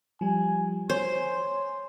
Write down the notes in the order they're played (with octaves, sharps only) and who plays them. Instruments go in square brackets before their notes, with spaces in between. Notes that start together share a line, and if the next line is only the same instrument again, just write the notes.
[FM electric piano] F3 G3 [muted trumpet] G#5
[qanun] C5 [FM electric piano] C#5 G#5 [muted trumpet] C6